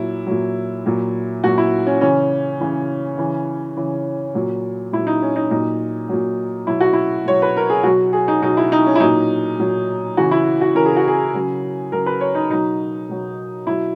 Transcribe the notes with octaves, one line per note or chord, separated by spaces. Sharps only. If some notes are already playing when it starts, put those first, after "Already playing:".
Already playing: A#2 F#3 E4
A#2 F#3
A#2 F#3
A#2 F#3 F#4
E4
C#4
C#3 E3 C#4
C#3 E3
C#3 E3
C#3 E3
A#2 F#3
A#2 F#3 E4
D#4
C#4
D#4
A#2 F#3 D#4
A#2 F#3
B2 F#3 E4
F#4
E4
B2 F#3 C#5
B4
A#4
G#4
B2 F#3 F#4
G#4
D#4
B2 F#3 D#4
E4
D#4
C#4
E4
A#2 F#3 D#4
A#2 F#3
C#3 E3 F#4
E4
F#4
C#3 E3 A#4
G#4
F#4
G#4
C#3 F#3
C#3 F#3 A#4
B4
C#5
D#4
B2 F#3 D#4
B2 F#3
B2 F#3 E4